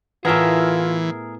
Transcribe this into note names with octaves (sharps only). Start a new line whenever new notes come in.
A2 E3 B3 F4 G#4 A#4 E5